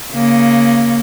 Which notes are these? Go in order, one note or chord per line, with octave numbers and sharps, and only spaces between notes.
C#3 A#3